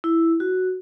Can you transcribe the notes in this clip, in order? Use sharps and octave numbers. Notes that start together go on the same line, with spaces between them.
E4
F#4